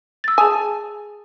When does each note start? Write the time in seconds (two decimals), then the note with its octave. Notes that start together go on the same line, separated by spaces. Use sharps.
0.24 E6 A6
0.38 G#4 G#5 A5 D#6